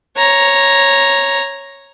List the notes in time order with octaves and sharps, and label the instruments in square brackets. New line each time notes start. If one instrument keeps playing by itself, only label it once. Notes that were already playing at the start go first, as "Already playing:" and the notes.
[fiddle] C#5 A#5